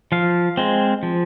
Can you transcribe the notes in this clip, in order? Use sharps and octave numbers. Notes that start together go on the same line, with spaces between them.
F3 F5
G#3 C4
F3